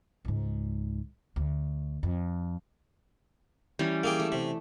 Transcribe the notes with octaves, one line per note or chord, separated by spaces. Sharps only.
C#2 G#2
D2
F2
E3 G3 C#4
A#3 G#4 G5
A3
C3